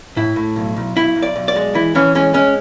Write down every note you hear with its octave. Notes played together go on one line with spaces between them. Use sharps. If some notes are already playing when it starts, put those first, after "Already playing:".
A2 E4
A2
B1
B1
B1 E4
B1
D5
B1
D5
G#3
E3 E4
E3 C#4
G#3 C#4
G#3 C#4